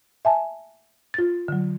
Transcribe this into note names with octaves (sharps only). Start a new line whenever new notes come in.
E5 G#5 A5
F4 A6
D3 F#3